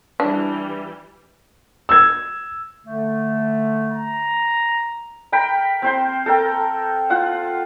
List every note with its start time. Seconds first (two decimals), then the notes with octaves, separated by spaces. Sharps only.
0.20 E3 G3 D4
1.89 E6 G#6
2.84 D3 A3
3.92 A#5
5.32 A#4 G5 B5
5.82 C4 C5 C6
6.26 A4 A#4 G5
7.10 F4 F#5